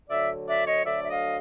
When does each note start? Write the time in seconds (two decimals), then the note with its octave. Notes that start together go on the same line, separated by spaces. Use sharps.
0.09 D2 D3 F#3 D5 E5
0.47 D5 E5
0.66 C#5 D#5
0.84 D2 D3 F#3 D5 E5
1.03 E5
1.09 D#5 F5